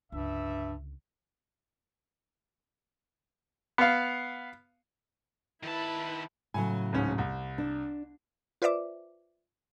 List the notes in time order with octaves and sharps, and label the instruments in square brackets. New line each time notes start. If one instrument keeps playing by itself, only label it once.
[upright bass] C#2 D3 [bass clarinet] G2 [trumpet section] E5
[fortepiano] B3 F5
[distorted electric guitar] D#3 A5 [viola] E4 B4
[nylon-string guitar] A2 C#3 F#3 [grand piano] G#5
[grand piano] D1 G#2 C#4
C2
[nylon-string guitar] D4
[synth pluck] F4 B4 C5 D5 E5 D6